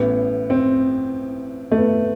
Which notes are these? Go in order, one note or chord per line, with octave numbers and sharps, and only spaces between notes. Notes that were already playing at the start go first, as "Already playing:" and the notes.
Already playing: A1 A2 E3 B3
C4
A3
B3